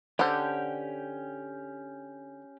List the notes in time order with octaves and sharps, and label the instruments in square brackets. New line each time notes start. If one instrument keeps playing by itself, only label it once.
[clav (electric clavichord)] D3 [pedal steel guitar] C#4 G4 G5 [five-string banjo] C5 F#5